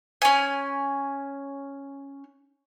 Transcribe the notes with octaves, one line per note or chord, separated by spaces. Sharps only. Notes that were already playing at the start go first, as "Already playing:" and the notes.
C#4 G#5